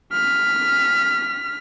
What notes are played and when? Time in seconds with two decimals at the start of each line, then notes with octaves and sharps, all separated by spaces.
0.13 F6 B6